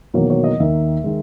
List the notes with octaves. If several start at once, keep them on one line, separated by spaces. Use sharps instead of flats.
E1 E2 D#3 F#3 A#3 C#5
C#5
D#5
D#2 D#3 A#3 E5
D#3 G#3